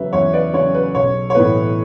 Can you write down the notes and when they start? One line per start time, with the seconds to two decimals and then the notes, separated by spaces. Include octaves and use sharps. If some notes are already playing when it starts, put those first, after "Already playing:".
Already playing: E2 C#3 F#3 B4 E5
0.13 E2 C#5
0.33 B4 D5
0.53 C#3 F#3 C#5
0.75 B4
0.95 B1 C#5
1.30 C#5
1.35 A2 E3 B3 B4